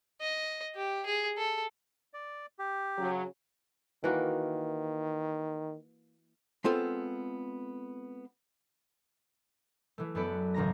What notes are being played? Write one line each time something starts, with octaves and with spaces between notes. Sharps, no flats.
D#5
G4
G#4
A4
D5
G4
C#3 F#3
D#3 E3 A#3 F#4
G#3 B3 C4 F4 A4
E3 A3
F#2 B3 A4 D5 B5
G#1 C#2 D#3 A#5 A#6